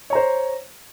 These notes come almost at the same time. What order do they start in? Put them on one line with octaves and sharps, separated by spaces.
C#5 A#5 C5